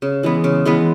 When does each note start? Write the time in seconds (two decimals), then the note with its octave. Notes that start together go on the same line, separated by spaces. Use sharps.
0.02 C#3
0.23 E3 G#3 B3
0.44 C#3
0.66 E3 G#3 B3